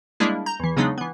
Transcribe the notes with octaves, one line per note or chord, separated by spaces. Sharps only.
G3 G#3 A#3 D4 E4 G#4
A#5 G6
E2 E3
C#3 F#3 G#3 B3 D4 D#4
E3 B3